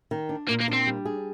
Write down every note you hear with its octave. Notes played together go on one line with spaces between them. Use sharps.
D#3
D4
A#2 A#3
A#3
D4
C4
G3
G#4